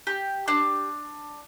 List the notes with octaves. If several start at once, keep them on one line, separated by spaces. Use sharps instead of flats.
G4
D4